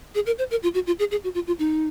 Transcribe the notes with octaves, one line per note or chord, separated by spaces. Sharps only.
G#4
A#4
C5
A#4
F4
F#4
F4
G#4
G#4
F#4
F4
F4
D#4